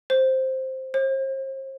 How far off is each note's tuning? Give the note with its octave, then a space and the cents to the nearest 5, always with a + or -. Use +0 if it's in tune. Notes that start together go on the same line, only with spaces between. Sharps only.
C5 +5
C5 +40